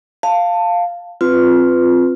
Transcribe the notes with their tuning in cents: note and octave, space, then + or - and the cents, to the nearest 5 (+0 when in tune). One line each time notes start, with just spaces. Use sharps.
F5 +0 A5 +15
C4 +0 F4 +0 B4 +15